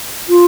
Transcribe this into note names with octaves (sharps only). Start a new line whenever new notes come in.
F4